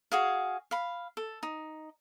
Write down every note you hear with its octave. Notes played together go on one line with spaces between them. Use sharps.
F#4 G#4 F5
F5 B5
A4
D#4